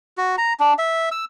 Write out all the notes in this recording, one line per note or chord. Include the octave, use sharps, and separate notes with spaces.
F#4
A#5
D4
E5
E6